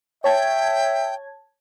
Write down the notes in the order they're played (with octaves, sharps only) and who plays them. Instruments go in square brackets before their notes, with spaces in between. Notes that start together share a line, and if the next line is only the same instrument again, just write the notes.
[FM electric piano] C#5 A5 G#6 [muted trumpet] E5 [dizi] G5